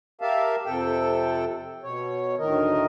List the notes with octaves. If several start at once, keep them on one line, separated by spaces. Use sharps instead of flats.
G4 A#4 E5 F5 A5
F2 C3 A4 G5
B2 C#5
D2 A2 D#3 A#4 D#5